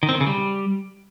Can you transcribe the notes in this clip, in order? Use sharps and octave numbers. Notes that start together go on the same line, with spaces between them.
D#3
C4
D#3
C#3
G3